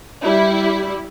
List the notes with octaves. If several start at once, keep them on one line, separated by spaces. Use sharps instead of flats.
G3 E4